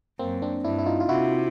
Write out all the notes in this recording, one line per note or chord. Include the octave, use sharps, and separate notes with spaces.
F#2 A#3 C4
C4 D4
G2 D4 E4
E4
D#4 F4
F4
C3 E4 F#4